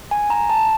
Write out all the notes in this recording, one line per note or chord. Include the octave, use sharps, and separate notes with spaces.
G#5
A#5
A5